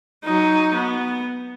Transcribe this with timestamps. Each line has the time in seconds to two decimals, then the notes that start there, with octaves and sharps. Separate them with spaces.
0.24 F#3 D#4
0.74 B3